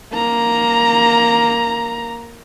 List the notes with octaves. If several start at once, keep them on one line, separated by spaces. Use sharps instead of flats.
A#3 A#5